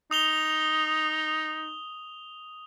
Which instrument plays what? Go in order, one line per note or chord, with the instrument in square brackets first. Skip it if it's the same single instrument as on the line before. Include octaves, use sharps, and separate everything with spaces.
[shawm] D#4 [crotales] D#6 F7 G7